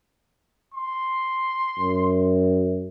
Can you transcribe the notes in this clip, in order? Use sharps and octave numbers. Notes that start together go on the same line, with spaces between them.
C6
F#2